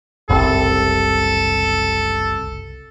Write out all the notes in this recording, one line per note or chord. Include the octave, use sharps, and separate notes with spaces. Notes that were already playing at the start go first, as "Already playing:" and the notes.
F#1 C2 C3 A4